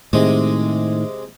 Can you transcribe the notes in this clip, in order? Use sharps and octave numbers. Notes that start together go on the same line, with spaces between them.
A2 C3 D#3 G#3